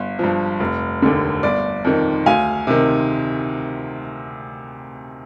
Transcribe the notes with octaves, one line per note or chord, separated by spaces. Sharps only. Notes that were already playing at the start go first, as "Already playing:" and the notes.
Already playing: G1
G2 F3
F1
D#2 D3
G1 D5
F2 D#3
D2 F5 G#5
C3 D#3